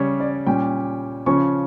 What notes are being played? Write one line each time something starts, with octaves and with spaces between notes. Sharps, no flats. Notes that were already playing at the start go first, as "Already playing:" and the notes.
Already playing: C#3 G3 C#4 C#5
D5
A#2 G3 C#4 G5
C#3 F3 C#4 C#6